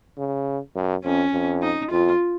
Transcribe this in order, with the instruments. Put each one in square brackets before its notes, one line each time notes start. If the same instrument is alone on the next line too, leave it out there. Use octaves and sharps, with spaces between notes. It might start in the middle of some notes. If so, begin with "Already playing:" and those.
[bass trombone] C#3
F#2
[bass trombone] F2 [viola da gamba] C#4
[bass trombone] F2
[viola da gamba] D#4
[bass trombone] F2 [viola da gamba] F4